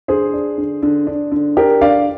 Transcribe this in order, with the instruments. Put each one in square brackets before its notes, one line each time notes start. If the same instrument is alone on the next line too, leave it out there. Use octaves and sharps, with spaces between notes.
[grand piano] D3 G#4 C5
D4
D3
D3
D4
D3
D4 G4 A#4
D3 D5 F5